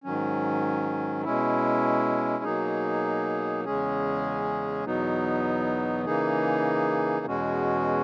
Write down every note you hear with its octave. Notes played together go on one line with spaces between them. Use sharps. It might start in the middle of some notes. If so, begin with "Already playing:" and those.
G#2 D#3 F#3 C#4
B2 G#3 C#4 E4
B2 F#3 A#3 D#4 G#4
E2 C#3 G#3 C#4 G#4
E2 B2 F#3 B3 D#4
C#3 E3 A#3 D#4 G#4
E2 B2 G#3 C#4 F#4